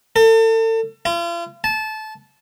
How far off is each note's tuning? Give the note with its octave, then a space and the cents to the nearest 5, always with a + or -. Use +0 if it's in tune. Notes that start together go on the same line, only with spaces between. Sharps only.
A4 +35
F4 -40
A5 -20